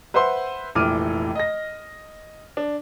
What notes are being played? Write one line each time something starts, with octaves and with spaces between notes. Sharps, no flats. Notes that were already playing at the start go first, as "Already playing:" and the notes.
B4 C5 E5 F#5 C6
F1 A#1 E3 D6 F6 D#7
D#5 A#6
D4